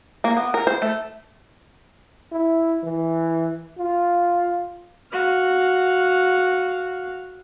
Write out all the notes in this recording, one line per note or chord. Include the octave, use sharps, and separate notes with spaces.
A#3
B3
A#4
C5
A3
E4
E3
F4
F#4 F5